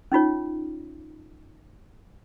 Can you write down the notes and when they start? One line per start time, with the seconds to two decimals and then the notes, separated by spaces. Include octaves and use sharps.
0.12 C#4 D#4 F4 C#5